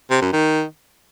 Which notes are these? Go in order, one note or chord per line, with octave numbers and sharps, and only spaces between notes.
C3
F#2
D#3